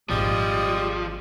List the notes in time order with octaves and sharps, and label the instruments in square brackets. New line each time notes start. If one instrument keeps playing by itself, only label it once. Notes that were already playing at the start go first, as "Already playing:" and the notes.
[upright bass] G#1 A#2 [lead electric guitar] F3 [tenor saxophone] G3 [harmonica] G#3 D#6